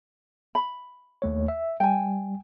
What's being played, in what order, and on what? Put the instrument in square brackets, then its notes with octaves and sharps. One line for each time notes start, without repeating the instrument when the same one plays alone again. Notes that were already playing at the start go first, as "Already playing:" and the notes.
[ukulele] B5
[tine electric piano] D#2 A3 C#5
E5
[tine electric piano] G3 [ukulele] G5 G#5